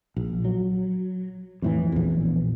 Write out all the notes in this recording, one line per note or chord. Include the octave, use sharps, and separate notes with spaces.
A#1
F#3
F2 A2 E3
A#1 E2